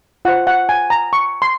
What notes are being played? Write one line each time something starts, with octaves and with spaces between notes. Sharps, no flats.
F4 C5 F#5
F#5
G#5
A#5
C#6
C6